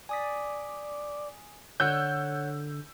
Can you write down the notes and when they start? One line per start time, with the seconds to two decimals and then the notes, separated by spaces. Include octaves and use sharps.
0.09 D5 G#5 D#6 B6
1.80 D3 C#5 F#5 E6 F#6 G6